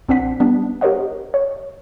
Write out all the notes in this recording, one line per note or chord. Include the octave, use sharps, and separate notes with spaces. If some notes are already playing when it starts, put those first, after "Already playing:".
A#1 C4 D4 C5 F#5 B6
G3 B3 D4
G4 A#4 C5 C#5 D#5 F#5
C#5